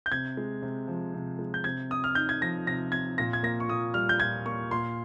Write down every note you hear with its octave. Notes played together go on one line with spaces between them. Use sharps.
G6
C3 G#6
G#3
C3
F3
C3
G#3
G6
C3 G#6
C4 D#6
F6
D#4 G6
G#6
F3 A#6
C3 A#6
C4 G#6
A#2 A#6
G#6
A#3 A#6
C#6
A#2 D#6
G3 F6
G6
A#2 G#6
A#3 C#6
A#2 C6